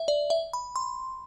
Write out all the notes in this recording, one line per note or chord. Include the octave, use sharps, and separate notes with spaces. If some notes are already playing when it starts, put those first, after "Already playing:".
Already playing: E5
D5
E5
B5
C6